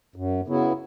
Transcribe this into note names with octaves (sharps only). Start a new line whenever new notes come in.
F#2
C#3 F#3 B3 E4